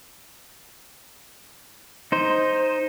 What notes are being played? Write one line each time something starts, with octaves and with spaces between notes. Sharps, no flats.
D#4 C5